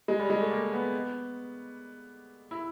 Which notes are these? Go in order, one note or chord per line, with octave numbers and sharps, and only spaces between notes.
G#3
G3
G#3
A3
A#3
B3
E4